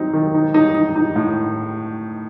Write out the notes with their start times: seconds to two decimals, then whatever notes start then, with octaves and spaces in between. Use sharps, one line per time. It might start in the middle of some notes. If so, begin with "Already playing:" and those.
Already playing: F#3 C4 D#4
0.13 D#3
0.34 D#4
0.54 D#4
0.75 D#4
0.96 D#4
1.16 A2